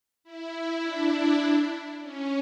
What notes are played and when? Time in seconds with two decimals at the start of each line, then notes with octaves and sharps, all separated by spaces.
0.24 E4
0.83 D4
2.02 C#4